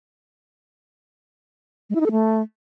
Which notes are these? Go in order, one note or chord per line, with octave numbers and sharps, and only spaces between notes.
G#3
E4
D#4
A4
A3